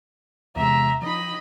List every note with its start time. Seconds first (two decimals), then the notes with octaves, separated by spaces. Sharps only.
0.56 E2 C3 G#3 E5 A#5
1.02 F3 D#4 D#5 B5